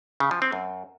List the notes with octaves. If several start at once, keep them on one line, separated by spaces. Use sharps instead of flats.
C#3
F3
C4
F#2